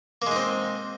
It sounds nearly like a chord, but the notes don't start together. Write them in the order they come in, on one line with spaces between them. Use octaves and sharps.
A#3 G#3 D#4 C4